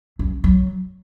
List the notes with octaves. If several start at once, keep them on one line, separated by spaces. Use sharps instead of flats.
F#2
F#3